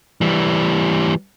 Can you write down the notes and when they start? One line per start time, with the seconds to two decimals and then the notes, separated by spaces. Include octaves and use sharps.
0.21 E3 G3